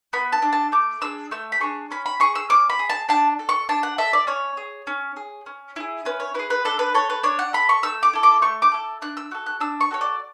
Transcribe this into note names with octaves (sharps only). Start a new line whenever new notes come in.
B3 B5
A5
D4 A4
A5
A3 D6
D4 G#4 E6
A3 E6
B5
D4 G#4 C#6
C#4 B5
B5
G#4 C#6
E6
C#4 D6
B5
G#4
A5
D4 A5
A4
C#6
D4 A5
F#5
A4 E5
D5
C#4 C#5
G#4
C#4
G#4
C#4
E4 G#4
C#4 B4
C#5
E4 G#4 B4
B4
D4 A4
B4
A4 C#5
B4
D4 C#5
F#5
A4 B5
C#6
A3 E6
D6
E4 A4
D6
A3 C#6
D6
E4 A4
D4 F#6
E6
F#4 A4
F#6
D4 E6
C#6
F#4 A4 C#5
D5